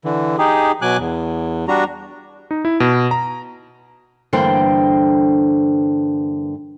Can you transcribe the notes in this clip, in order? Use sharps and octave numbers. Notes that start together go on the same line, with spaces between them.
D3 E3
D#4 G4 G#4
B2 F#3 G#5 D6 F#6
E2
G3 D4 F#4 A#5
D#4
E4
B2
A#5
G2 D3 E3 A#3 C5 G5